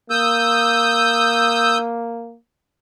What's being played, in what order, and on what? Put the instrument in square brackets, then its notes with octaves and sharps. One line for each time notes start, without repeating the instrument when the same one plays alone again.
[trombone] A#3 [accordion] D#6 E6 G6